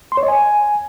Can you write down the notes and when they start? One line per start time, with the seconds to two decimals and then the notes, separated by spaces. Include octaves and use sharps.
0.12 C6
0.17 C#5
0.23 D#5
0.28 G#5